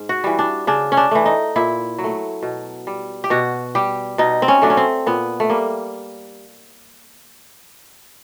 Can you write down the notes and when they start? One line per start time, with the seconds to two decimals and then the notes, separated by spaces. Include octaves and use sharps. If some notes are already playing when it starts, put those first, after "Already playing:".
Already playing: G#2
0.09 F#4
0.24 E3 G3
0.39 D4
0.67 C#3 D4
0.92 C#4
0.97 D4
1.11 E3 A3
1.26 D#4
1.56 A#2 E4
1.98 F#3
2.04 A3
2.43 B2
2.87 G3
3.24 G4
3.30 B2 F#4
3.75 G3 G4
4.18 B2 D#4
4.42 C4
4.48 C#4
4.62 F#3 A3 D4
4.70 C#4
4.77 C4
5.06 A#2 B3
5.40 A3
5.50 G3 A#3